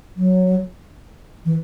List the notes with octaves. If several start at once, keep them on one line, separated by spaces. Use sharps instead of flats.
F#3
E3